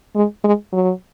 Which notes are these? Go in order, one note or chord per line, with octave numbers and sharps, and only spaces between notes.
G#3
G#3
F#3